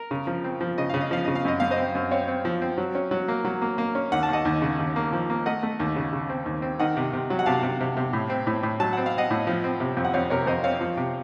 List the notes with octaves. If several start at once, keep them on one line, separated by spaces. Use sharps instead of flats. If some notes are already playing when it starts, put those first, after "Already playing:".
Already playing: A#4
C#3
F3
C4
F3
C#3 D#5
C#3 F5
D#5
F3 F5
C#3 D#5
F5
F#2 D#5
F#2 F5
C5 D#5
C4
F#2
C4 C#5 F5
C4
F3
C4
F#3
C#4
F#3
A#3
F#3
A#3
A#3
C#4
D#2 F#5
A5
D#2 D#5 F#5
D#2
C#3
D#2
A#3
F3
A#3
A3 D#5 F#5
A3
D#2
C#3
C#3
C4
D#2
C4
D#3 D#5 F#5
C3
C3
F#3
F#5
C3 F5 A5
C3
C3
C3
A2
C4
A2
A2
F#3 A5
C4 F#5
F5
C4 D#5 F#5
A2
F3
C4
C3
F2
F#5
F2 C#5 F5
C3 A#4 C#5
F2 C5 D#5
C4 C#5 F5
F3
C3